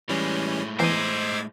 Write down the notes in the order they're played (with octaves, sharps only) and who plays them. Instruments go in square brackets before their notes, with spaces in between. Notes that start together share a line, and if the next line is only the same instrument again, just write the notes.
[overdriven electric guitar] A2 G#3 [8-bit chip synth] E3 G3 C#4
[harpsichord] E2 A#5 [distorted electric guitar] C5 D#5 [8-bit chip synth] D6 E6 G#6